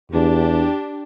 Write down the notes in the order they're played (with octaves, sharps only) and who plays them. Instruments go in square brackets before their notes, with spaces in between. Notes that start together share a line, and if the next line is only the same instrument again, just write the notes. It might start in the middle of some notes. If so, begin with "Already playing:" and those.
[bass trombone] E2 [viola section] D4 G4